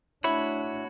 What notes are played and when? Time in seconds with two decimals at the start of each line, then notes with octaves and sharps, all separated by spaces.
0.24 A3 D4 E4 F#4 C#5 B5